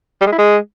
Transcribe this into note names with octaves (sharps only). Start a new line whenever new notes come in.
G3
G#3
E4
G#3